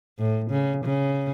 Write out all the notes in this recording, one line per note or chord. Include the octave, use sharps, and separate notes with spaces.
A2
C#3
C#3